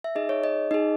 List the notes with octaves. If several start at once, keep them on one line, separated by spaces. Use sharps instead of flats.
E5
D#4 G#4 D#5
C#5
D#5
D#4 G#4 D#5